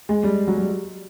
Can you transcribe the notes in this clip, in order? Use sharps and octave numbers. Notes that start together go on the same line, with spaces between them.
G#3
G3
F#3
G3